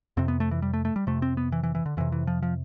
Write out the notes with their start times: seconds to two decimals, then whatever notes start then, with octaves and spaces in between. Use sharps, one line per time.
0.17 F2 C3 C4
0.28 B3
0.40 A3
0.51 E3
0.62 G3
0.74 A3
0.85 A3
0.96 G3
1.07 F2 C3 A3
1.22 C4
1.37 B3
1.52 E3
1.63 E3
1.75 E3
1.86 D3
1.97 F2 C3 E3
2.12 E3
2.27 F3
2.43 F3